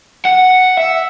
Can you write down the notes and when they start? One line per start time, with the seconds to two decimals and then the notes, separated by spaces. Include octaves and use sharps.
0.25 F#5
0.77 E5